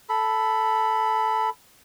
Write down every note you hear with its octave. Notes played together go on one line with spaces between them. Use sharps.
A4 B5